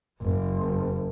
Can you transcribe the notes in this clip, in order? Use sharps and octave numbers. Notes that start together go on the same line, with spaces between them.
F#1